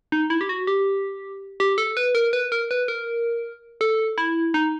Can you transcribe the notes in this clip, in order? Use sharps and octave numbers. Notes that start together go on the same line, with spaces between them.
D#4
E4
G4
F#4
G4
G4
A4
B4
A#4
B4
A#4
B4
A#4
A4
E4
D#4